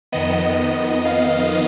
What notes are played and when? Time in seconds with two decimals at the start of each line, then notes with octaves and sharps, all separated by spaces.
0.12 F2 D#3 B3 D#5
1.05 F5